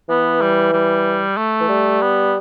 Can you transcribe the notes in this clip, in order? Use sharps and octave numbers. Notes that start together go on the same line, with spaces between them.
E3 B3
G3
G3
A3
E3
G3
B3